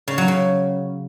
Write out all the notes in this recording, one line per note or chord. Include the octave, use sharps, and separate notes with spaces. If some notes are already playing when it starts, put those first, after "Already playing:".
C#3
F#3
C#3